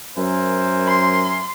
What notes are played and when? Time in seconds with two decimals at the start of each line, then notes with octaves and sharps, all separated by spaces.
0.17 F#2 A#4 C5 E5 G#5
0.87 C6